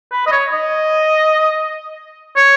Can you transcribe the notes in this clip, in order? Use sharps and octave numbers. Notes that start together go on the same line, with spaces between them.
B4
D#5
C#5
D#5
C#5